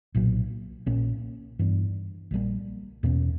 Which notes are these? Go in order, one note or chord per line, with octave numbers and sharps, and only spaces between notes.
B1 A#2 F#3 A#3
A#1 A#2 A#3 C#4
G2 E3 B3 D4
A#1 A#2 G3 A#3
E2 B2 A#3 C#4